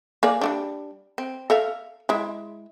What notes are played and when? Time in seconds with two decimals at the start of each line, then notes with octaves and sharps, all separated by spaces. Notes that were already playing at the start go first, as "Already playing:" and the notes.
0.23 A#3 G#4 D5
0.41 G3 A3 D4
1.18 C4
1.50 A4 E5 F5
2.09 G#3 E4